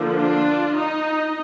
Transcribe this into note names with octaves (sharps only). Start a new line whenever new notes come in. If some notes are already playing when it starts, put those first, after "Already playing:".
Already playing: D3 F3 A#3
D4 F4
D#4